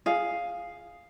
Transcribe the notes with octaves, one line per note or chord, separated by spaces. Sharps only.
G#4 F5